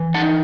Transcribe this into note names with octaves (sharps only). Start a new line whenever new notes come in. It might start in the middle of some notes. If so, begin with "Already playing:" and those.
Already playing: E3
D#4 F#5 A5